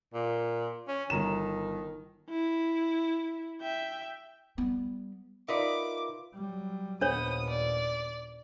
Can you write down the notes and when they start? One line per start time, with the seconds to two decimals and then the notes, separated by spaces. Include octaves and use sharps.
0.14 A#2
0.88 C#4
1.10 G1 D#3 A#5 E7
2.30 E4
3.61 E5 G5
4.58 G3 B3
5.48 D#4 F4 A#4 B4 D5 E5 D6
6.34 F#3 G3
7.01 D#2 A#2 B3 D4 C5 C#5 D#6
7.49 D5